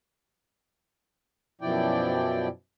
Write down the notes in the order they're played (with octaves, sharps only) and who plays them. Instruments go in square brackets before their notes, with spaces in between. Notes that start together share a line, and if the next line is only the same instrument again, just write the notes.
[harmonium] F#2 B2 F3 E4 D5 G5